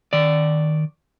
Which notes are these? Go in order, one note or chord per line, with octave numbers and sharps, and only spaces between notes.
D#3 D5